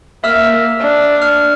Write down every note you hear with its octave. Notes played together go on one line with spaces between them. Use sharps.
A#3 E5 E6 F6
D4
F6